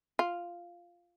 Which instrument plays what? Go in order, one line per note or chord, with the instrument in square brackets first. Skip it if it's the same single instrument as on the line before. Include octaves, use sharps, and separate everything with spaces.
[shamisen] F4